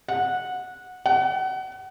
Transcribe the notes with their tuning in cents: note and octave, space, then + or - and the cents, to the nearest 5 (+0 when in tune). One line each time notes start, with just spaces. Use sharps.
F#5 -15
F#5 +30